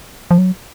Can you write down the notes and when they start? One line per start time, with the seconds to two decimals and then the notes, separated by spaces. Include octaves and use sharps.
0.31 F3
0.38 F#3